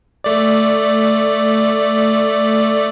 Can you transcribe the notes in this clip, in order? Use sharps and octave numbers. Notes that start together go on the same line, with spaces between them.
A3 D5